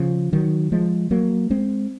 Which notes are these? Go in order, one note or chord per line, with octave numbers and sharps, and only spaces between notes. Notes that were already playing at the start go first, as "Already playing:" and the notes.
Already playing: C#3 F3
D#3 F#3
F3 G#3
F#3 A#3
G#3 C4